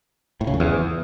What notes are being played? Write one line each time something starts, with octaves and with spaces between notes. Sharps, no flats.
A2
C#3
F2
E2